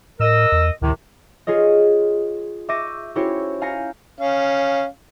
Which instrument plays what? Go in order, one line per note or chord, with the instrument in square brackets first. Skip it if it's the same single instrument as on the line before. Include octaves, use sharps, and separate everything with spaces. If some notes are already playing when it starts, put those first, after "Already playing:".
[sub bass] A2 [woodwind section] A#4 D#5 E6
[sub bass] E2
[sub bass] D2 [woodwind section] A2 C3 D#3
[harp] F4 G#4 C#5 D#5
E5 C#6 D6 G6 A#6 D#7
C#4 E4 F#4 G4 C5 C#5
F5 G#5 A#5 G6 A#6 C#7
[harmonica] C#4 F5